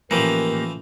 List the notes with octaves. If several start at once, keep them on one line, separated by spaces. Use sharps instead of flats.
A2 E3 F3 A#3 C#4 G4 A#4